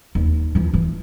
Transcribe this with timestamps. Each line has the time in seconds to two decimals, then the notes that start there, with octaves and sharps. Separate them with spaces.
0.15 D#2
0.55 E3 F3
0.74 E3